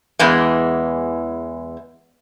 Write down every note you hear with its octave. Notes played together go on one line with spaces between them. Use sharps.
E2 E3 G#3